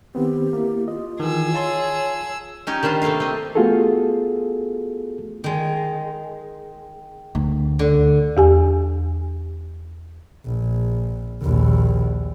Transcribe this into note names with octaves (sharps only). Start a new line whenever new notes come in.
D#3 B3 C4 G4
A#3 E4
F4 D#5
D#3 E3 G#4 E6
F4 C#5 A5 C6
C#4 D#4 G4 C#5
D#3 G3 D4 F4 C5
C3 A3 A#3 F4 F5
C4 D#5
A3 B3 F4 F#4 G#4 A4
D#3 G#3
D2
D3
E2 G4 G#5
A#1
A#1 D#2